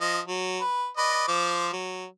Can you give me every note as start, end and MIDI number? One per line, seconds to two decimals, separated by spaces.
0.01 0.19 53
0.01 0.19 75
0.28 0.59 54
0.61 0.88 71
0.98 1.26 71
0.98 1.26 74
0.98 1.26 75
1.28 1.68 53
1.28 1.68 72
1.28 1.68 86
1.72 2.05 54